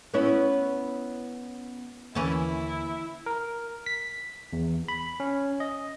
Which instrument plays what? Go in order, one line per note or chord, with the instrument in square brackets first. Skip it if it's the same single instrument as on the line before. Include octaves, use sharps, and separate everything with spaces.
[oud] B3 C#4 E4
[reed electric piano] D#2 D3 A#3 [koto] E3 C#4 A5 [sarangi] E4
[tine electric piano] A#4
B6
E2
B5
C#4
D#5